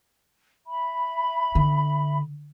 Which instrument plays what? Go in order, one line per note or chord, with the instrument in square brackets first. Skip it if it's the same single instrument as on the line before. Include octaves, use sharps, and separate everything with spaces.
[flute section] E5 B5
[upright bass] D3